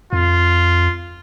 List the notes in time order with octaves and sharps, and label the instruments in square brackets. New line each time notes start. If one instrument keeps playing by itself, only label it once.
[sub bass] F2 [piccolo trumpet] F4